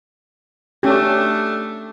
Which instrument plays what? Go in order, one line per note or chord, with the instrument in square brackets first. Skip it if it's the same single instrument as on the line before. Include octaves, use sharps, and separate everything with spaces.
[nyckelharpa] A3 D4 [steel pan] C#4 G4